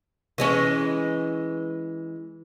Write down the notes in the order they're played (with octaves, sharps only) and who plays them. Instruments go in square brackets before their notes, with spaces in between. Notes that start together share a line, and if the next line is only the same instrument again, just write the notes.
[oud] E3 G#3 C#4